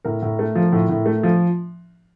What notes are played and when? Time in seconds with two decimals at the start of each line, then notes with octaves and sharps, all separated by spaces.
0.05 A2 A#4
0.22 A2
0.39 A3
0.55 F3
0.73 A2
0.89 A2
1.06 A3
1.23 F3